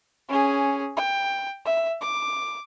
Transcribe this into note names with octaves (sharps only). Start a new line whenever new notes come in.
C#4 G#4
G5
E5
D6